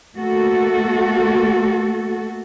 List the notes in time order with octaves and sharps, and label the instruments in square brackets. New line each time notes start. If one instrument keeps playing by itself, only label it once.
[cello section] A3 A#3 F#4 A4